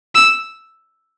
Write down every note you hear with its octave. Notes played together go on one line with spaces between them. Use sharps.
E6